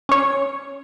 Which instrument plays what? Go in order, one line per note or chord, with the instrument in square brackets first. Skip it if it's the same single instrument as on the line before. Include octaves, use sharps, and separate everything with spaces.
[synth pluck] C#4 C#5